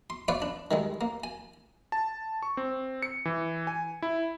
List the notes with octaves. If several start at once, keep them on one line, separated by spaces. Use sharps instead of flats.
C6
F4 B4 C#5 D5 F5
D4
D#3 G3 G#3
A#3
G#5
A5
C#6
C4
C#7
E3
G#5
E4